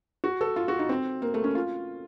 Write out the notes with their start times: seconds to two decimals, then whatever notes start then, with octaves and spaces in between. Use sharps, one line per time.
0.24 F#4
0.41 A4
0.56 F4
0.68 F#4
0.79 D#4
0.89 C4
1.22 A#3
1.34 A3
1.44 C#4
1.55 F4